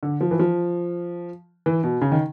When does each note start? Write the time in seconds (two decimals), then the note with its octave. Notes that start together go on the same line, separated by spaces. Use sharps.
0.03 D3
0.21 F3
0.31 E3
0.39 F3
1.66 E3
1.83 B2
2.01 C#3
2.12 D#3